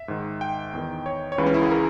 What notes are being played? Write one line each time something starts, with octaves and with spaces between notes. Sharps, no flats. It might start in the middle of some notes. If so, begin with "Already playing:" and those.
Already playing: E5
G#2 D#3
G5
E2 D#3
C#5
C#5
C#2 C#3 E3 B4
C#4
E4
G#4
A#4